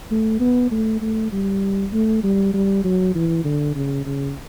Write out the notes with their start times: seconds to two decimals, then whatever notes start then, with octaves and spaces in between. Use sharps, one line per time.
0.11 A3
0.40 B3
0.71 A3
1.02 A3
1.32 G3
1.93 A3
2.23 G3
2.54 G3
2.84 F#3
3.15 E3
3.45 D3
3.75 C#3
4.05 C#3